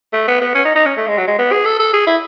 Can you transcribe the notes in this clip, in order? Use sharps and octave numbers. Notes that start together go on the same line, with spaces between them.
A3
B3
B3
C#4
D#4
D#4
C#4
A3
G#3
F#3
G#3
B3
G#4
A4
A4
G#4
E4